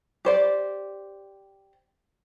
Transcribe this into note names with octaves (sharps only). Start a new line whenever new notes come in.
G4 C5 D5